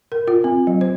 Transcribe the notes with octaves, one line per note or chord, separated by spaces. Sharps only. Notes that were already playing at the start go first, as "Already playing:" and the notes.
A#4
F4
C4
F#3
C5